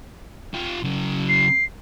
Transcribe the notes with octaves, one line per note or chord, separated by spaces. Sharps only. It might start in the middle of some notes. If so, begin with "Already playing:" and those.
F4 G4
C#3 F#3
C7